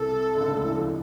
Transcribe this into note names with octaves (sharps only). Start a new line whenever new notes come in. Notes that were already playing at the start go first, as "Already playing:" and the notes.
Already playing: C2 C3 A4
D3
C#2 C#3
D2 D3
E2 E3
F2 F3
G#3